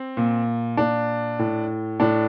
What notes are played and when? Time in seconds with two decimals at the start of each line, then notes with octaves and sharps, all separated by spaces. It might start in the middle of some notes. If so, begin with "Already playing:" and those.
Already playing: C4
0.17 A#2
0.77 A#2 D4
1.39 A2
2.00 A2 D4